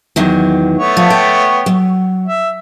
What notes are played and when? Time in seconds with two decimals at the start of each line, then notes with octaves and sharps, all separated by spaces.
0.16 E2 D#3 F#3
0.78 A3 B3 C#5
0.97 F3
1.10 G5
1.66 F#3
2.27 E5